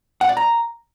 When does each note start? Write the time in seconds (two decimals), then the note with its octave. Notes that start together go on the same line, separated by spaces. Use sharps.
0.21 F#5
0.29 D5
0.37 A#5